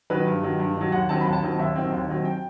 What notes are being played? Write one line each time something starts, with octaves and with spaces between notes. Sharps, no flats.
D#3 F#3 B4
G2
D#3 F#3
G2
D#3 F#3
D#2 F#5
D#3 F#3 C4 A5
D#2 B5
A5
D#3 F#3 C4
D#2 E5
D#3 F#3 C4
D#2
D#3 F#3 C4
G5